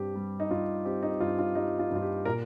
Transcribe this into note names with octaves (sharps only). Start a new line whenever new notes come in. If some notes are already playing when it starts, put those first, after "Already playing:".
Already playing: G2 C4 G4
G3
D#4
G2 F4
C4 G4
D#4
G2 F4
F4
G3 D#4
F4
G2 F4
G4
A#2 A#4